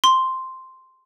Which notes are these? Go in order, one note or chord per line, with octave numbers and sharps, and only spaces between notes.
C6